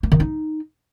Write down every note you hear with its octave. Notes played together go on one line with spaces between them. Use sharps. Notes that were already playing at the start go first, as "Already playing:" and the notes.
A#3
D#3
D#4